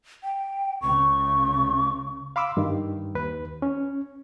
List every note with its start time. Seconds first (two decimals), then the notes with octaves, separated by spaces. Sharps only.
0.24 G5
0.82 C#2 C#3 C#6
2.36 F5 B5 C6 D6 E6
2.57 G2 D#3
3.15 D#2 B4
3.62 C#4